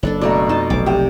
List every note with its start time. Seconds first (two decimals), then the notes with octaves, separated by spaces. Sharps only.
0.03 F#1 D4 A4 B4
0.21 B2 A3 D5 A#5
0.49 F2 D#4 A5
0.70 F1 B1 D6
0.86 C3 G4 G5